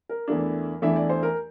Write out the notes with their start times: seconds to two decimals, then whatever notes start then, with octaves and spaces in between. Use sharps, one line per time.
0.09 A#4
0.28 E2 E3 A3 D4
0.82 E2 E3 A3 D4 E5
0.96 D5
1.10 C5
1.23 A#4